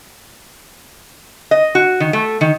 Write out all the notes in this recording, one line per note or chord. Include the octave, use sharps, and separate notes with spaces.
D#5
F#4
D#3
A3
D#3